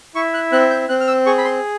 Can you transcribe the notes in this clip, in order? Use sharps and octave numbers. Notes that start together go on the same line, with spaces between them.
E4 C#6
F#6
C4 F#6
G6
C4 F#6
F6
E6
G#4 C#6
B5
C6